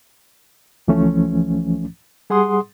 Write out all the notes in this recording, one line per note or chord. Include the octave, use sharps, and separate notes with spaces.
C#2 E3 F3 A3 C#4
G3 G#4 F#5 C6 D#6